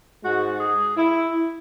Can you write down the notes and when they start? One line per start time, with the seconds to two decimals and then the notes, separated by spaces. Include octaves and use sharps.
0.23 G#2 G#3 F#4
0.59 G#4
0.96 E4